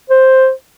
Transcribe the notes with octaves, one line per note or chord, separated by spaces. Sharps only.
C5